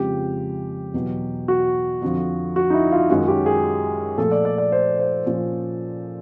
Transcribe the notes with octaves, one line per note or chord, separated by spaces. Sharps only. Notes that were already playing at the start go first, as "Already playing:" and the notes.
Already playing: F2 C#3 F3 G#3 C4 G4
E2 B2 F#3
F#4
F2 D3 F3
F#4
D#4
E4
F4
F#2 D#3 G#3 C#4 F#4
G4
G#4
A#2 F3 A3 A4
D5
D5
D5
C5
C5
A#2 F3 A#3 C#4